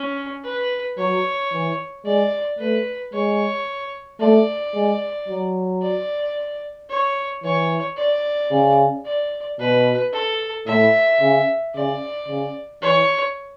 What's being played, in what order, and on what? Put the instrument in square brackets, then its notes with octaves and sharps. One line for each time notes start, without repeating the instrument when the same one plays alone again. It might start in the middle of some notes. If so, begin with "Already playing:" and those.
Already playing: [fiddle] C#4
B4
[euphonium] F#3 [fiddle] C#5
[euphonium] E3
[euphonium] G#3 [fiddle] D5
[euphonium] A3 [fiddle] B4
[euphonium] G#3 [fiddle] C#5
[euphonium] A3 [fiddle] D5
[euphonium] G#3
F#3
[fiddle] D5
C#5
[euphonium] E3 [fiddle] C#5
[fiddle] D5
[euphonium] C#3
[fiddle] D5
[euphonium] B2 [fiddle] B4
[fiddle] A4
[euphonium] A2 [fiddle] E5
[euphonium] C#3
[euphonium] C#3 [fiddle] D5
[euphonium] C#3
[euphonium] E3 [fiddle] C#5